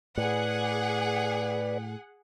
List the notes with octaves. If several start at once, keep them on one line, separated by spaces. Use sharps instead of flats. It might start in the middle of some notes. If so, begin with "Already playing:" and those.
A2 G#4 B4 D5 F#5